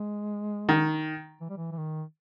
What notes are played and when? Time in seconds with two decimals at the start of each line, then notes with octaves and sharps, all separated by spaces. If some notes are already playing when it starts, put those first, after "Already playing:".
Already playing: G#3
0.69 D#3
1.41 E3
1.50 G3
1.57 E3
1.72 E3
1.77 D#3